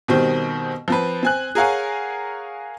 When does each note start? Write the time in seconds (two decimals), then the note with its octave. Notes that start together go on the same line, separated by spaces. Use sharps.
0.08 B2 D#3 G3 C4
0.88 F3 C4 B4
1.23 C4 G#5 F#6
1.55 G#4 A#4 C#5 F5 F#5 G#5